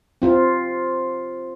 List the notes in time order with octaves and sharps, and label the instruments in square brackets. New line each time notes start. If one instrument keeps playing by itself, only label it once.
[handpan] C4 F4